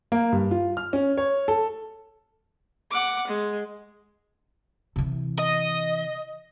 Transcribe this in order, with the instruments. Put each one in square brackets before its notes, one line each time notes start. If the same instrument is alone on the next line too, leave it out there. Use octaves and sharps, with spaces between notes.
[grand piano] A#3
G2
F4
F6
C#4
C#5
A4
[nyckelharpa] F#5 D6
G#3
[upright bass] C3 E3
[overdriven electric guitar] D#5